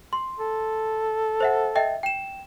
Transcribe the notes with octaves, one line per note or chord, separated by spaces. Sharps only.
C6
A4
C5 E5 F#5
D#5 E5 G5
G5 E7